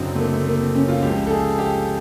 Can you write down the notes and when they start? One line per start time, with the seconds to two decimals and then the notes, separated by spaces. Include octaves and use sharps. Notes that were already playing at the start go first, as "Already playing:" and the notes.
Already playing: F#1 F#2 D3 F#3 C4
0.15 A3
0.19 A#3
0.33 A3
0.47 A#3
0.61 C4
0.75 C#4
0.89 F4
1.03 C#2 C#3 F3 G4
1.26 A4
1.31 G#4
1.59 G4